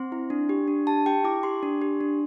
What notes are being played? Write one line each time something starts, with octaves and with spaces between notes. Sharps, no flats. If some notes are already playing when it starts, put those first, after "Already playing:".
Already playing: C4 C6
E4
D4
G4
D4
G4 A5
G4 G5
E4 D6
G4 C6
D4
G4
D4